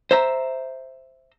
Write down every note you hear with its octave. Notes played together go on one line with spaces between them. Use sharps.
C5 E5 A#5